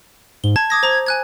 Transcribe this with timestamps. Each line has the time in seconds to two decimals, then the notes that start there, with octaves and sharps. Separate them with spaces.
0.44 G#2 G7
0.56 A5 G#6
0.70 D6 D#6 A#6
0.83 C5 A#5
1.07 G#5 F#6 G#6